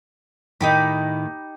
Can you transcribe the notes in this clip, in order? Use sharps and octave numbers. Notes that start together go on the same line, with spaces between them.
A2 D#3 D#4 G4 B5